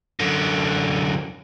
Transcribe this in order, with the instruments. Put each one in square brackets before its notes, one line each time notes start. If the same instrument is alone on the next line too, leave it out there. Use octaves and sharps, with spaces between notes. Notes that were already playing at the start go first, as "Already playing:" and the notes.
[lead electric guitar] F#2 D3